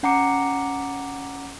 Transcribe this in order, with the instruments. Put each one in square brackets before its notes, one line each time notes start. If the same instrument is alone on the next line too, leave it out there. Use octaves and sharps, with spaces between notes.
[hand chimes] C#4 F#5 A#5 D6 C#7